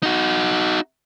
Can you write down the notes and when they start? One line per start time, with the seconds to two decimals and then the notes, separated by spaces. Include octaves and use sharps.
0.03 D#4 F#4